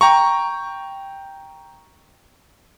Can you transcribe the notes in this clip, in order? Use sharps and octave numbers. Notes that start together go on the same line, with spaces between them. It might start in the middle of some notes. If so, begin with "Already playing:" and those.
G5 A#5 C#6